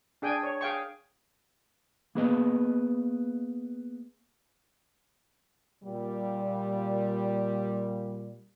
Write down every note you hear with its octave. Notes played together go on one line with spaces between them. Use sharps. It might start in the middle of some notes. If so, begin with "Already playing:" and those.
D4 G#4 G5 G#5
C#5
G#4 F5 G5 C#6
A#3 B3 G#4 B4 D#5
A#2 G3